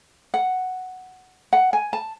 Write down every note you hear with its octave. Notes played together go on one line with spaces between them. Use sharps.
F#5
F#5
G#5
A5